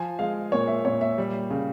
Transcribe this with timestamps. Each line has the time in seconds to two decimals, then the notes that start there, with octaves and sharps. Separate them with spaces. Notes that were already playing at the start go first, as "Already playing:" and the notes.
Already playing: F3 G#5
0.19 G#3 F5
0.52 A#2 C#5
0.68 E5
0.85 A#2 C#5
1.01 E5
1.18 G3
1.50 C#3